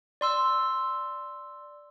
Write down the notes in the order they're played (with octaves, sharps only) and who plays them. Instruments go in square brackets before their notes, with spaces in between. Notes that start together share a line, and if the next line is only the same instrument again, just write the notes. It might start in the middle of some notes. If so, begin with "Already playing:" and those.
[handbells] D5 C6 E6